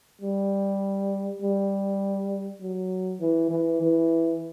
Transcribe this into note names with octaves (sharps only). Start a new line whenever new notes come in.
G3
G3
F#3
E3
E3
E3